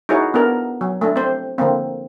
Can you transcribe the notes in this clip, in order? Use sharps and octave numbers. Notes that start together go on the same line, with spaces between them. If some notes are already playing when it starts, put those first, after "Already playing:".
D#4 E4 F#4 G#4 C#5
B3 D4 A#4
F#3
A3 D4
C4 C5
D3 F3 A#3 C4